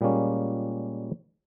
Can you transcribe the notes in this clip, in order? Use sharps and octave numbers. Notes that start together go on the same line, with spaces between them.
A#2 G3 G#3 A#3 C#4